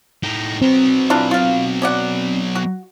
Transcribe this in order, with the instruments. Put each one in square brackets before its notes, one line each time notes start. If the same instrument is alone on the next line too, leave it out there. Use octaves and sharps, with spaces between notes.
[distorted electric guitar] A2 D#4
[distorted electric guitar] F#3 B3 [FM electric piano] C4
[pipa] E3 D4 F4
F4 F5
C#4 D5 F#5
F#4